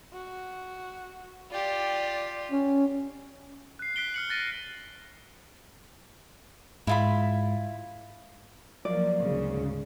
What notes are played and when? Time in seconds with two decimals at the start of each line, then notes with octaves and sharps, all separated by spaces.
0.13 F#4
1.51 F4 G4 D5
2.51 C#4
3.79 F#6 C7
3.96 F#6 B6 D7 G7
4.14 F6 C#7 F#7
4.29 F#6 A6 A#6 D#7
6.87 G#2 E4 F4 B5
8.85 F3 F#3 A#3 D5
9.22 D2 G#2 C#3